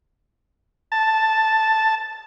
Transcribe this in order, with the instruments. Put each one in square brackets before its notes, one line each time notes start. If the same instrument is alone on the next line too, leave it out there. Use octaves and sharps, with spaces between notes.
[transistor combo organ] A5